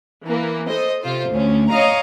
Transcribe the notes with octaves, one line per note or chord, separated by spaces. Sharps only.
E3 A#3
A4 C5 D#5
C3 F4 C5
D2 C#4
C#5 D#5 F5 A#5